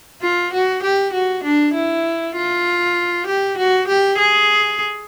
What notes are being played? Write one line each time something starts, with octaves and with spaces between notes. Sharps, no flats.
F4
F#4
G4
F#4
D4
E4
F4
G4
F#4
G4
G#4